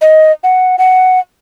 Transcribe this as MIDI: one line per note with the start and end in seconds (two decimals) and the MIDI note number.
0.01 0.32 75
0.44 0.76 78
0.78 1.20 78